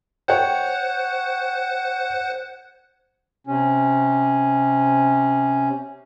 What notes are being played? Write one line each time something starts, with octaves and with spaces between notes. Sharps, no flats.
C5 C#5 F#5 G5 F#6
C3 C#4